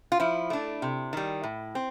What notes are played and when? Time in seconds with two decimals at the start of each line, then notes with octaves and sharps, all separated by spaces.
0.12 F4
0.20 F3 E4
0.50 A3 D4
0.82 C3
1.13 D#3 G3
1.44 A2
1.75 C4